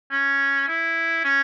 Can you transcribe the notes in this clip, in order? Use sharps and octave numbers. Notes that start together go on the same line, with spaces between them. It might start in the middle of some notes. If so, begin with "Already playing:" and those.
C#4
E4
C#4